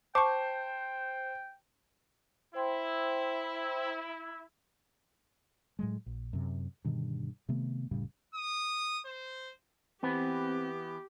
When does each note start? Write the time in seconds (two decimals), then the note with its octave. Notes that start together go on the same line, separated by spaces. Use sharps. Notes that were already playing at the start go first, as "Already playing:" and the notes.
0.15 C5 G5 A5 C#6 D6
2.55 E4 C5 G5 C6
5.79 A2 F#3 G#3
6.06 A#1
6.33 F#2 C3
6.85 G2 B2 D3 D#3
7.49 C3 D#3 A3 B3
7.91 F1 A2 C#3 G3
8.35 D#6
9.06 C5
10.03 E3 B3 C4 G4